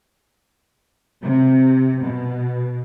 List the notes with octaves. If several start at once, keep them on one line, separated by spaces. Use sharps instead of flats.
C3
B2